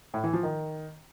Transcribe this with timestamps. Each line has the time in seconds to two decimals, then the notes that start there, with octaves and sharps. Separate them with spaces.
0.14 A2
0.24 E3
0.33 F3
0.43 D#3